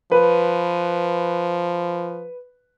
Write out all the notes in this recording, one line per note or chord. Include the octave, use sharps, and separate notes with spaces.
F3 B4